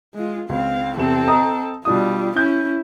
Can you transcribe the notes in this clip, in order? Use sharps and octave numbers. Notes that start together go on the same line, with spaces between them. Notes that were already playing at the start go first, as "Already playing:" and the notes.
G#3 F4
C#2 C4 F5
E2 C3 C4 A4 E7
D#5 A#5 D#6
B2 G3 D4 F4 D#6
C#4 E4 G6